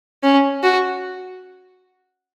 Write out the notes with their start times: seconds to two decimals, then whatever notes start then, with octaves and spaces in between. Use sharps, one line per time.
0.23 C#4
0.63 F#4